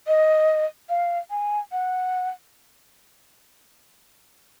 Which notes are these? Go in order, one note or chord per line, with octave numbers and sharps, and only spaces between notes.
D#5
F5
G#5
F#5